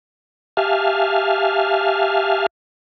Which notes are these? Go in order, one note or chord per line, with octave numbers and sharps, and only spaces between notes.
G4 E5 F5 G#5 A5 F6